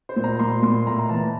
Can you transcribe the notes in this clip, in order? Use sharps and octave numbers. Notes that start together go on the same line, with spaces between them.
C5
A#2
A#5
A#2 C6
A#2 C6
A2 A#5
A#5
E3 A5